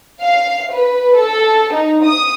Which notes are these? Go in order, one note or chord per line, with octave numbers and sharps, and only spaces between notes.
F5
B4
A4
D#4
D#6